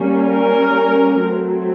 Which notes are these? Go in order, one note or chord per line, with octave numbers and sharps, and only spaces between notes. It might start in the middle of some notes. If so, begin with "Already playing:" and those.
Already playing: G3 A#3 C#4
A#4
F#3 A3 C4